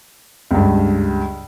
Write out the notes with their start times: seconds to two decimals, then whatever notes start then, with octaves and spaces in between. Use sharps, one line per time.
0.51 C#2 G2